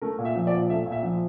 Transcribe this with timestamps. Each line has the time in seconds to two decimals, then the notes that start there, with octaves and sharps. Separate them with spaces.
0.02 A3 A#4
0.18 A#2
0.25 E5
0.35 F3
0.47 D5
0.53 A#2
0.70 A3 E5
0.86 A#2
0.92 E5
1.03 F3